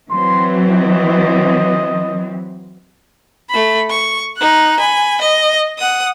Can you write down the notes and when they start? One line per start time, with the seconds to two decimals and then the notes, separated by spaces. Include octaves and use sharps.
0.11 E3 F#3 C4 C6
0.72 D#5
3.50 A3 B5
3.90 C#6
4.37 D#4 F#6
4.80 G#5 B5
5.21 D#5
5.78 F#5 D#6